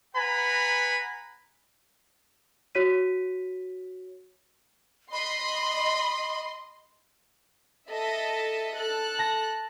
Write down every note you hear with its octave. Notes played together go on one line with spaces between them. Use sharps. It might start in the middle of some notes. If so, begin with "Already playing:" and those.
B4 F#5 G#5 A#5 B5
F#4 C#5 B6 D#7
D#5 B5 C6
A4 D#5 E5
A4 F#6
A5 A#6